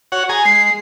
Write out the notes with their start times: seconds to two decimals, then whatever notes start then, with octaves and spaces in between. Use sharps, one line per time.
0.12 F#4 C#5 F#5
0.29 G#4 G#5 A#5
0.45 G#3 C7